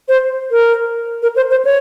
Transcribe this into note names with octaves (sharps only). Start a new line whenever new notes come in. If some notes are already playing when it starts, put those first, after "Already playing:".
C5
A#4
A#4
C5
C5
C#5